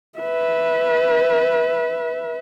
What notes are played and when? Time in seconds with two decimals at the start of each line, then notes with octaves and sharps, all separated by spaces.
0.19 B4 E5